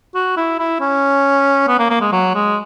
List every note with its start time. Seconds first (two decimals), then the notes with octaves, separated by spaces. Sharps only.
0.15 F#4
0.37 E4
0.59 E4
0.81 C#4
1.68 B3
1.79 A#3
1.90 A#3
2.01 G#3
2.12 F#3
2.35 G#3